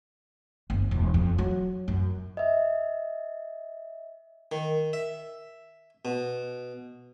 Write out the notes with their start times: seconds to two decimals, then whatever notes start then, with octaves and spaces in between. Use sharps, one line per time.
0.70 G1
0.91 E1
1.14 F2
1.38 F#3
1.88 F#2
2.37 D#5 E5
4.52 D#3
4.93 E5
6.05 B2